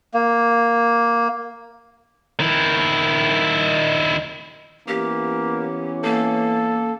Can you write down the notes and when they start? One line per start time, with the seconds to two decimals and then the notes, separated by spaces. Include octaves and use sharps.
0.14 A#3
2.40 D#3 E4
4.88 E3 A#3 B3 C#4 G4
6.04 A#3 A4